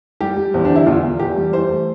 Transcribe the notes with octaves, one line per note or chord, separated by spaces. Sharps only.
G3 G4
G3
E2 C4
D4
D3
E4
E2 F4
E2
E2 G4
G3
E3 C5
A3